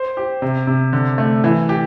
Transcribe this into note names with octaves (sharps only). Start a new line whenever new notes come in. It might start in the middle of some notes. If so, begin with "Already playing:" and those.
Already playing: C5
G4
C3
C3
D3
A3
E3
G4